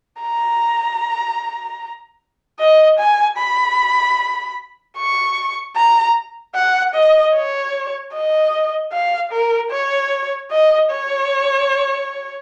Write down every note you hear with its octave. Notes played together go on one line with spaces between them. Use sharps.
A#5
D#5
G#5
B5
C#6
A#5
F#5
D#5
C#5
D#5
F5
A#4
C#5
D#5
C#5